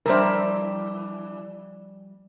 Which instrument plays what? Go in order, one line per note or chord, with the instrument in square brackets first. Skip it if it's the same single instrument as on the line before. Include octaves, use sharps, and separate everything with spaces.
[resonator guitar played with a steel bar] E3 D4 [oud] F3 G3 E5 [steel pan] A#4 C5